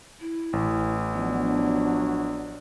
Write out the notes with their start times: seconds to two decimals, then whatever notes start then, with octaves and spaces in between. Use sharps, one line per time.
0.21 E4
0.53 A1
1.13 F3 F#3 B3 D4